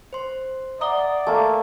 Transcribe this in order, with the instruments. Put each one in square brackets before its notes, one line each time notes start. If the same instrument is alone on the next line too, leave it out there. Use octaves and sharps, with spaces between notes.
[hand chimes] C5 C6
[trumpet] D5 [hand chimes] E5 F#5 [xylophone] A#5 D#6 G7
[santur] A3 A#3 [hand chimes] G#5